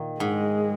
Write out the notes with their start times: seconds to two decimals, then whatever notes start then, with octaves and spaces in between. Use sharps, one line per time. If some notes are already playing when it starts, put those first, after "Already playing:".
Already playing: A#2 D#3
0.20 G#2 G#3